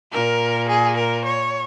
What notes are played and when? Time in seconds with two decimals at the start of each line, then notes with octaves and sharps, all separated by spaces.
0.12 A#2 A#4
0.69 G#4
0.97 A#4
1.25 C#5